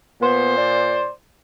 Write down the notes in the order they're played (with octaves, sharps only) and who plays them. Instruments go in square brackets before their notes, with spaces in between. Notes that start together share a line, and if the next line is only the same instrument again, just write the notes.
[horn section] A#2 C5 [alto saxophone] B3
[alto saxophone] D5